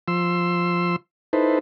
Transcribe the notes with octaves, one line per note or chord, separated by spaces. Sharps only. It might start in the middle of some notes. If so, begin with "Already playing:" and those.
F3 C6 E6
D#4 E4 A4 B4 C5